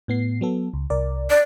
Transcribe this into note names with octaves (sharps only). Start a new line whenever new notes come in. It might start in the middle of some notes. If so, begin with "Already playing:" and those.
A2 B3 C7
F#3 B3 A4
C#2
C2 A#4 D5
D5